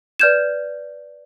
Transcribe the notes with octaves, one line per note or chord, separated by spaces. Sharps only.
B4 D5 F6 G6 G#6 E7